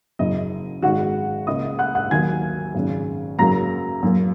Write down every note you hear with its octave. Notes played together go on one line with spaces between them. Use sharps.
F#1 F#2 C#3 D#5
G#1 G#2 G#3 F#4 F#5
C#2 C#3 A#3 D#5 D#6
F#5 F#6
F#5 F#6
D#2 D#3 F#3 A#3 G#5 G#6
G#1 F#2 C#3
F#2 C#3 F#3 A#3 A#5 A#6
F#2 F#3 A#3